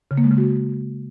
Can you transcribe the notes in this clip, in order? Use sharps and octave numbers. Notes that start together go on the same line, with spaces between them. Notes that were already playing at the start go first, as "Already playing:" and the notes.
C#3
A#3
G#3
C#3
F#4